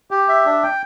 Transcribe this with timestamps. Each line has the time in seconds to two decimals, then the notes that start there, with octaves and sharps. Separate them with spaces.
0.11 G4
0.28 E5
0.45 D4
0.63 G5